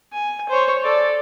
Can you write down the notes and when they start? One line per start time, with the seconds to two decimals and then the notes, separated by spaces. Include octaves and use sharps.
0.13 G#5
0.49 C5 C#5
0.83 A4 D5